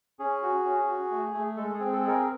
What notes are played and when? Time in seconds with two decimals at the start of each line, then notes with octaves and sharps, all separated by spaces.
0.19 C#4 G#4
0.43 F#4
0.65 C#4
0.88 F#4
1.11 A3
1.33 A3
1.57 G#3 A4
1.67 A4
1.74 G#4
1.80 C4
1.92 A4
2.03 G#4 A#4
2.21 A#4